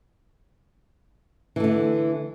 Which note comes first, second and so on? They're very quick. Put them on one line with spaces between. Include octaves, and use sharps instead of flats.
E3 A3 D3